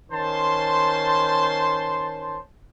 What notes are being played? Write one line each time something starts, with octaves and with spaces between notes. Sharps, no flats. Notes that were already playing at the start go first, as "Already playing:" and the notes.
D#3 C#4 C5 A5 C6